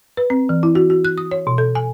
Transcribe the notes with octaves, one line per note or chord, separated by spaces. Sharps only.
B4
C4
E3
E4
F#4
F#4
F#6
D#6
C#5
B2
A4
G#5